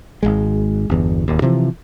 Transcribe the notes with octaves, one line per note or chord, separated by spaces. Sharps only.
G#1 C#2 G#3
G1 E2
D1 D#2
C3 E3 F3